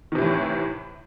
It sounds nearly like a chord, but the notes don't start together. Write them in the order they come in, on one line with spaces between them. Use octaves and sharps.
D#3 C3 E3 A2